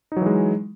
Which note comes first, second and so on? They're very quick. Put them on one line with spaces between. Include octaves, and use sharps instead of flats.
D#4 F#3 E3 G#3